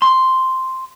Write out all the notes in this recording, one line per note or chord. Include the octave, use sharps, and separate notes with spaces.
C6